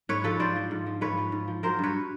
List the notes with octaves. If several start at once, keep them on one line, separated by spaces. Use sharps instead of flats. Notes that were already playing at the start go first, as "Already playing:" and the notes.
G#2 B4 C#5
F3 A4 B4
G#2 C5 D5
F3
G#2
F3
G#2 B4 C#5
F3
G#2
F3
F#3 A#4 C5
G2 B4 C#5